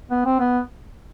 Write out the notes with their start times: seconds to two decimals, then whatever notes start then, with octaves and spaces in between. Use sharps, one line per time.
0.11 B3
0.25 C4
0.40 B3